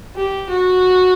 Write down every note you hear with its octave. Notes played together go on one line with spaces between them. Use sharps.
G4
F#4